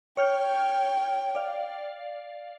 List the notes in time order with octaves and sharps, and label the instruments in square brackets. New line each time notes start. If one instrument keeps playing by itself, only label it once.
[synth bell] C#5 F6 G6 [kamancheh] G5
[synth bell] D5 F5